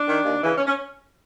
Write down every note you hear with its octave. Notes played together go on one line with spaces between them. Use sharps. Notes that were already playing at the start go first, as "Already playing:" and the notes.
Already playing: D4
D#3
D#2
C#3 E3
C#4
C#4